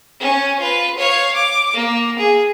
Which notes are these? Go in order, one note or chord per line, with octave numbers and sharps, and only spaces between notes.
C#4
F4 B4
C#5 F5
D6
A#3
G#4